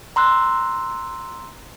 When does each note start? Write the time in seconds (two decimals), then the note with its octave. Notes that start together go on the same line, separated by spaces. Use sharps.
0.16 A#5 C6 E6 F#6